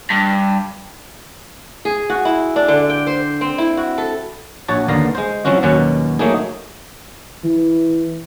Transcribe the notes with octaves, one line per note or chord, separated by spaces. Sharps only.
G2
G#4
F#4
E4
D4
D3
G5
C5
C4
E4
F#4
A4
A#1 F#4 C#5 A5
D#2 D3 B3 F5 A#5
G#3 C5
F3 F#3 C4 C#4 F#4
D#2 B2 F#3 C#4 F#5
F#3 A3 A#3 D#4 G#4
E3